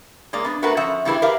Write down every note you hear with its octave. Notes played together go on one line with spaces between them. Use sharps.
G#3 A#3 D5
B3 D4
A3 F#4 A#4 B4 F#5
F3 C#4 E5 F#5
G2 E3 G3 E4 G#4 B4
G4 A#4 B4 E5 F5